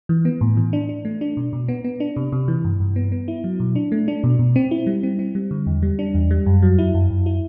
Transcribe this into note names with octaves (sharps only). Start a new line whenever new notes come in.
E3
B3
A2
E3
D4
D4
A3
D4
B2
B2
B3
B3
D4
C3
C3
E3
G2
G2
B3
B3
E4
F#3
B2
D4
A3
D4
B2
B2
C4
E4
G3
C4
C4
G3
D3
E2
G3
D4
E2
G3
F#2
F#3
E4
F#2
F#2
E4